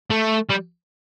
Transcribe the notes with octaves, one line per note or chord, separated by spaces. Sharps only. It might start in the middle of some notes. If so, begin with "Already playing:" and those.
A3
G3